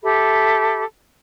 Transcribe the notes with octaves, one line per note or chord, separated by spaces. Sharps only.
G4 A4 E5 B5